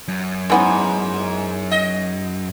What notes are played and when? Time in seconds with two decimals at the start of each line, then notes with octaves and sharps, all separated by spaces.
0.08 F#2
0.50 G#2 E3 B3 C#4
1.72 D#5